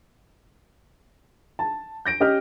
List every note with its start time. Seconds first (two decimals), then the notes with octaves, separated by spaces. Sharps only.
1.59 A5
2.05 G6 A#6 D7
2.20 C#4 G4 D#5 F6